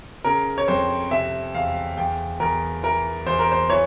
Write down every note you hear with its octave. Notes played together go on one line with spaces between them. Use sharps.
C#3 A#4
C#5
F2 C5
C3 E5
E2 F5
E2 G5
E2 A#4
E3 A#4
E2 C5
A#4
C5
E3 C#5